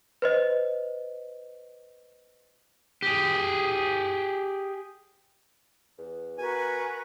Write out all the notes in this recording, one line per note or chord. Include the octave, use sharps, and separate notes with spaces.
B4 C5 D#5
G4 G#4
E2
B2 F#4 A#4 B4 G#5